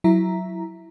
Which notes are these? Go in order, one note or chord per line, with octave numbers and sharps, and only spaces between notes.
F#3 E4 E5 A#5